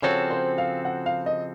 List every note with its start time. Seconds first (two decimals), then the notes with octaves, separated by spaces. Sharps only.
0.02 C#3 F3 C4 F#4 A4 C#5
0.31 C5
0.58 F5
0.85 F#5
1.06 F5
1.26 D#5